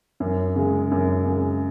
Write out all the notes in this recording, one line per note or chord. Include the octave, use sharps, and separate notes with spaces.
F#2
C#3 G#3
F#2
C#3 G#3